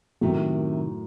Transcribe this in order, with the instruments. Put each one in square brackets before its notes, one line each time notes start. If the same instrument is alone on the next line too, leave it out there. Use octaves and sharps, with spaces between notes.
[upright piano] F#2 A2 [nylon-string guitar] C3 D#3 A3